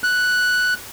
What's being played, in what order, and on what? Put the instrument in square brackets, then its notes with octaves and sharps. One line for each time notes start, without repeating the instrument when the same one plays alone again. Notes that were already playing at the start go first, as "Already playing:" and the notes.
[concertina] F#6